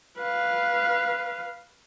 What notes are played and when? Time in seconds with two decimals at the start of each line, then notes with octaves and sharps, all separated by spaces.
0.18 B4 F5